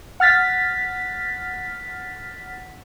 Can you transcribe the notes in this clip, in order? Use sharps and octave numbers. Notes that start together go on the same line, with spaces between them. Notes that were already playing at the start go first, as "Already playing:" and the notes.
F#5 F6 A6 B6